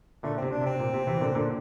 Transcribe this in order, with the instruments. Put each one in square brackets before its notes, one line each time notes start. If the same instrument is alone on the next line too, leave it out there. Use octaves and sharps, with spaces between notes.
[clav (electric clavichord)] A#2 D3 [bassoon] A3
[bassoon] C4
[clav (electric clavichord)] C3
[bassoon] D4
[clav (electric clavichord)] C3 [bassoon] C4
[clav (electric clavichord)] A#2
C3
C3 E3
A#2 D3
A#2 D3